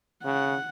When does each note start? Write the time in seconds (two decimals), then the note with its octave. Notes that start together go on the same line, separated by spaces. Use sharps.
0.24 C#3 F#5